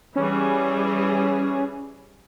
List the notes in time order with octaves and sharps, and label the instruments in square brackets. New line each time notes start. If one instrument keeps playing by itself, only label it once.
[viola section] E3 G3 G#4 [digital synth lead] C#4